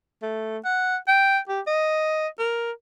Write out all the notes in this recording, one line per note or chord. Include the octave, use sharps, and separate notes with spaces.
A3
F#5
G5
G4
D#5
A#4